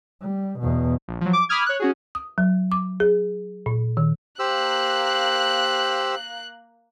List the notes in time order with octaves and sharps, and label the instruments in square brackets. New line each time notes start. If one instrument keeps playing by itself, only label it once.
[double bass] G3
E2 B2
[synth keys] A#1
F3 F#3
D6
B5 D6 D#6 F6 G#6
C#5 F#6
C#4 F#4 G#4
[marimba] D#6
F#3
D6
G#4
A#2
D#3
[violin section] A#3 F#6 [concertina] G4 C5 E6